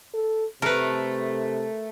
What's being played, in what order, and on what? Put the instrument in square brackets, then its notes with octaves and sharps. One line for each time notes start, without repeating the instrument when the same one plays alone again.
[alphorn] A4
[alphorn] C3 [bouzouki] A3 [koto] A#4 B4